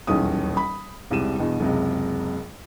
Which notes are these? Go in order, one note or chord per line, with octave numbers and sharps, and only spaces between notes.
D#1 B1 E2 C#4 D#6
B5
E1 C2 C3 G3 D#7 E7
E2 G2 B2
F#1 C#2 C3